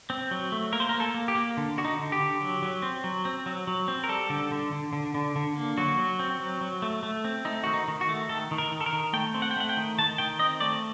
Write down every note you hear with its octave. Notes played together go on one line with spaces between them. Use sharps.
C4
F#3
A3
A#3 A#4
C5
A#4
A#3
A4
A#3
G4
A#3
D3
D3 F#4
D#4
D3
G4
D3
F#3
F#3
C4
F#3
C4
F#3
F#3
C4
A#4
G3 A4
D3
D3
D3
D3
D3
D3
A#3
F#3 F#4
F#3
C4
F#3
F#3
A3
A3
C4
A3 D#4
D#3 F#4
D#4
D#3
F#4
A3
D#3 A4
D#3
A#4
D#3
A4
A#4
D#3
A3 G5
C4
F#5
G5
A3 F#5
G5
D#3
D#3 A5
D#3 G5
C4 D#5
A3 D5